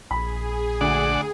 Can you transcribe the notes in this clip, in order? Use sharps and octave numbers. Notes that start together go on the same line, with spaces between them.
A#1 G#4 B5
D2 D4 D5 F#5